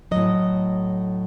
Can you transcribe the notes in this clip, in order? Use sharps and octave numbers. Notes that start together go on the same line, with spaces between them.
A2 F#3 D#5